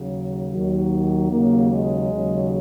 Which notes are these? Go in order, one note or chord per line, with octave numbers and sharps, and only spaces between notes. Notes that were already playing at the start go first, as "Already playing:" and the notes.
Already playing: D#2 C#3 F#3
D#2 D#3 F#3
D#2 C#3 F#3 A#3
G#3
D#2 C#3 F#3